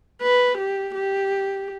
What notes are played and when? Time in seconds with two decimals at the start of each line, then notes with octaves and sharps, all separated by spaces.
0.21 B4
0.58 G4
0.95 G4